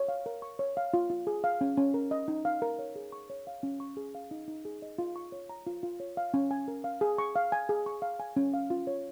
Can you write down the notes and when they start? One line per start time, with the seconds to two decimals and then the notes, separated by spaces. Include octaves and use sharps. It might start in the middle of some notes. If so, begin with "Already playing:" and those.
Already playing: C#5
0.08 F5
0.26 A#4
0.42 C#6
0.59 C#5
0.77 F5
0.94 F4
1.10 F4
1.27 G#4
1.44 F5
1.61 C#4
1.77 C#4
1.94 A#4
2.11 D#5
2.28 D#4
2.45 F5
2.62 A#4
2.79 C#5
2.96 G#4
3.12 C#6
3.30 C#5
3.47 F5
3.63 C#4
3.80 C#6
3.97 G#4
4.15 F5
4.31 D#4
4.48 D#4
4.65 G#4
4.82 D#5
4.98 F4
5.16 C#6
5.32 C#5
5.49 A#5
5.67 F4
5.83 F4
6.00 C#5
6.17 F5
6.34 C#4
6.51 G#5
6.68 A#4
6.84 F5
7.01 G#4
7.18 C#6
7.36 F5
7.52 G#5
7.69 G#4
7.86 C#6
8.02 F5
8.20 G#5
8.36 C#4
8.54 F5
8.70 F4
8.87 C#5